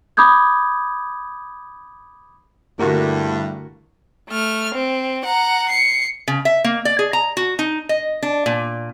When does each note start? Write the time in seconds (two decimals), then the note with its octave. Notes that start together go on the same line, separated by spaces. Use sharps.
0.17 B5 D6 D#6 G6 G#6
2.79 G2 D3 A3 A#3 E4 F#4
4.29 A3 F6
4.74 C4
5.25 F#5 A#5
5.69 C7 C#7
6.28 C#3
6.45 E5
6.64 A#3
6.85 D5
6.99 G#4
7.13 A#5
7.37 F#4
7.59 D#4
7.89 D#5
8.22 D4
8.46 A#2